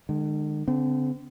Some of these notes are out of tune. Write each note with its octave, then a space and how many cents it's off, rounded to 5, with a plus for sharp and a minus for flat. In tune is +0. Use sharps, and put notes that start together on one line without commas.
D#3 -45 G#3 +0
D3 -45 C4 -35